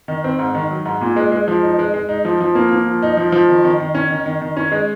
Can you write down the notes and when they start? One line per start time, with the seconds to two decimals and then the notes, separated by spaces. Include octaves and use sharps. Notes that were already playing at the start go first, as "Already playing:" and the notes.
0.08 D#3
0.24 C4
0.39 G#2
0.55 D#3
0.71 F#3
0.86 G#2
1.01 A#2
1.16 G#3
1.32 G#3
1.48 F3
1.63 D#4
1.79 G#3
1.94 G#3
2.09 D#4
2.25 F3
2.40 F3
2.55 A#3
2.71 A#3
2.87 F3
3.02 D#4
3.17 F3
3.32 F3
3.49 D#3
3.64 D#3
3.80 D#3
3.95 C#4
4.10 D#3
4.26 D#3
4.42 D#3
4.57 C#4
4.72 G#3